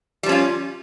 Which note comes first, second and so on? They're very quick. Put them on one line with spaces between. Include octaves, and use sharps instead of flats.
G3 F3 C#4 F4